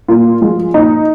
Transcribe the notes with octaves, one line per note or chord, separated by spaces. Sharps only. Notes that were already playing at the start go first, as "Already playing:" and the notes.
A#2 F4
F3 G#3
A#2 D#4